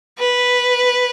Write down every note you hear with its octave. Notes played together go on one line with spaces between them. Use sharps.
B4